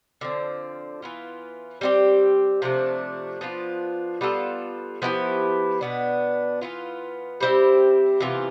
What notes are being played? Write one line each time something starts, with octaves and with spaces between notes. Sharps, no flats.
D3 F3 C4
E3 B3 F4
G3 C4 G4
C3 F3 A3 D4
F3 B3 D4 F4
G3 B3 F4 A4
F3 B3 E4 G4
B2 B3 D4
E3 B3 F4
G3 C4 E4 G4
C3 E3 B3 F4